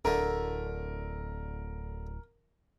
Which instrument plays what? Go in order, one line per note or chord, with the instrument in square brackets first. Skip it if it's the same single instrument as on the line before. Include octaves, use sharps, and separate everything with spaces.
[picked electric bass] D1 [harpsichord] D3 A3 [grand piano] A#4